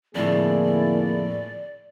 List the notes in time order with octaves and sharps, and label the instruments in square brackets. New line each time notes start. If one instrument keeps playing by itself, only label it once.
[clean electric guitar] F2 A2 [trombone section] D3 E4 G#4 [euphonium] A#3 [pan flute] D5